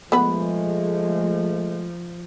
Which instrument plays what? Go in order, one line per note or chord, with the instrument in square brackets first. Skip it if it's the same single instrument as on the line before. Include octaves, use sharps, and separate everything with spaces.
[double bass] F3 [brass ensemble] G#3 A3 [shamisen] B3 B4